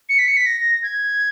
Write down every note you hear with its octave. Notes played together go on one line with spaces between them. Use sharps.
C#7
B6
C#7
B6
A#6
G#6